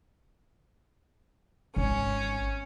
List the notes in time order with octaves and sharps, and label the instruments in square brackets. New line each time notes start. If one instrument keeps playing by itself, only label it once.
[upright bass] G#1 [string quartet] C#4